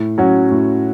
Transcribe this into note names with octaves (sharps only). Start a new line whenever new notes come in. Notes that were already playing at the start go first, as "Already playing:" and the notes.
Already playing: A2
F#3 C#4 F#4
A2